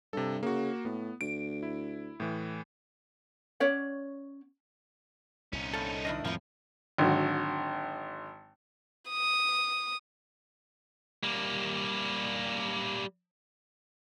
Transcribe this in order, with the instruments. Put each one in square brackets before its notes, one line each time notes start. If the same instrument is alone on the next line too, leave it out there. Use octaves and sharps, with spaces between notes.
[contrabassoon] G2 [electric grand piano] C3 A4
[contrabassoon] C#3 [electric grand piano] A#3 F#4
[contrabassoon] A2 [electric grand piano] B3
[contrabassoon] D2 [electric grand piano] D7
[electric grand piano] E4
A2 E3
[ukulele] C#4 C#5 D5 F#5
[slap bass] C2 A#2 [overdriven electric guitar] C#4 D#4
[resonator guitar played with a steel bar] G2 C4 [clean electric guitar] A4
[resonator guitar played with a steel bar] F#2 D#3 E4 [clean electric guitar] D4 D#5
[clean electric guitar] F2 [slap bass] A2 D#3 G#3 [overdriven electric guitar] F3 [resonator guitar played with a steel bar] A#3 E4
[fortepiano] G#1 D3 F#3
[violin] D#6
[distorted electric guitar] G3 A#3